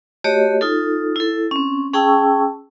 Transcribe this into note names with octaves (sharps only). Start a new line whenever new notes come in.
A3 F#4 G4 C#5 D#5
D#4 F4 A4
E4 A4
C4 C#4
C#4 G#4 G5 A5 C#6 E6